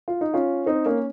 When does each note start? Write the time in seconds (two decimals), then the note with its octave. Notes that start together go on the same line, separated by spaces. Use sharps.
0.08 F4
0.21 D#4
0.34 C#4 F4
0.66 C4 D#4
0.86 A#3 C#4